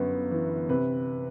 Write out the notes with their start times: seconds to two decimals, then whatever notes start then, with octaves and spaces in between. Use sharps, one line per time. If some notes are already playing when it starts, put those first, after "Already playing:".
Already playing: G1 F#2 B3
0.31 E3
0.69 C3 B4